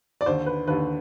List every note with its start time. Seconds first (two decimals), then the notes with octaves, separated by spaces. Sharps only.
0.21 D5
0.26 D#2 D3 C5
0.46 B4
0.67 D#2 D3 B4